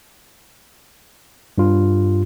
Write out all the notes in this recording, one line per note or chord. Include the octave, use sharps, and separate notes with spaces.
G2 F4